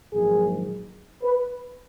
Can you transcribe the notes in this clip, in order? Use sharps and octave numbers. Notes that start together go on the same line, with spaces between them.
A#1 G#2 D#3 F#3 G#4
B4